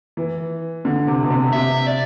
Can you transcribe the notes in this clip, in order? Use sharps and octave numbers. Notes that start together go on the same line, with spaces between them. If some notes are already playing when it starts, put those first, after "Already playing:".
E3
D3
C3
B2
C3
C3 E5
D5